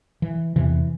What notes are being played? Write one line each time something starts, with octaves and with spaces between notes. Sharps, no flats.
E3
E2 C3 E3